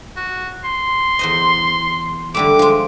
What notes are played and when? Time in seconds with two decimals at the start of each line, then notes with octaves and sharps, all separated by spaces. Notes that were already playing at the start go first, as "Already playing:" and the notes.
0.16 F#4
0.64 C6
1.19 E2 C5 D#5
2.35 D3 G3 A3 D6
2.59 F3 G#3